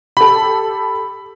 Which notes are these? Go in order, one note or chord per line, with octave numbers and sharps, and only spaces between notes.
G4 A4 B5